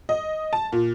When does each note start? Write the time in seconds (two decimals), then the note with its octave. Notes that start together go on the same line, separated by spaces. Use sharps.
0.09 D#5
0.53 A5
0.72 A#2